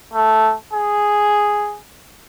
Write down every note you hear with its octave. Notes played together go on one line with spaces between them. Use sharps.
A3
G#4